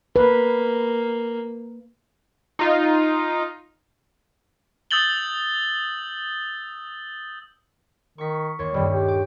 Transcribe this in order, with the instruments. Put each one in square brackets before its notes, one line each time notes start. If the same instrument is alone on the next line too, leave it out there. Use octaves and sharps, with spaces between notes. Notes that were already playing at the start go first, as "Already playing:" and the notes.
[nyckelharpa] A#3 [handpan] B4
[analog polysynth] D#4 F4
[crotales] D#6 E6 G6 A6 F#7 G7
[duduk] D#3 [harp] C#6 B6
[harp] D#2 C#5 C6
[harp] D#1 G2 [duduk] G3
[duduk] G4
[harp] D6